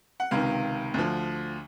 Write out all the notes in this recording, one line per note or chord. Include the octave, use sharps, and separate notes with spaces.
F#5
C#2 C3 D#3 F5
D2 D3 F3